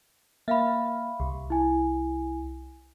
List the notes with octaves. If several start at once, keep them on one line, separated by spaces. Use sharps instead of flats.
A#3 E5 F5 B5
C2
E4 G#5